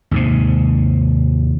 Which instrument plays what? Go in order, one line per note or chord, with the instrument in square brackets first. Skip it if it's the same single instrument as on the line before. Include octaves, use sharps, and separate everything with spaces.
[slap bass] D#2 G#2 C3